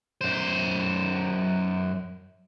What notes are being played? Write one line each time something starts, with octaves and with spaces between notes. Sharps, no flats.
F#2 C5